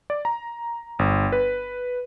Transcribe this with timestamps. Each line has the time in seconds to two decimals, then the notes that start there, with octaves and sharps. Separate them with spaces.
0.10 D5
0.25 A#5
0.99 G1
1.32 B4